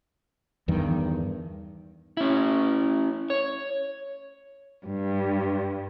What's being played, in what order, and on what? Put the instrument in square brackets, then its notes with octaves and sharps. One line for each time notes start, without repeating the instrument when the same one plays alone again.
[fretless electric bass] E2 G2 D#3
[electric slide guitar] C#4 E4
C#5
[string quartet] G2